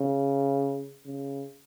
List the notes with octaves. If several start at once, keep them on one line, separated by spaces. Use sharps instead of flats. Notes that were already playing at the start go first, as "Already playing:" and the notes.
Already playing: C#3
C#3